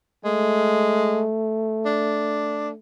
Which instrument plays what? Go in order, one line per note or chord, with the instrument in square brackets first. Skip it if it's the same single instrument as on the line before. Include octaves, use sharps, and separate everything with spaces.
[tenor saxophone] G#3 [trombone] A3
[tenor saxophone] D4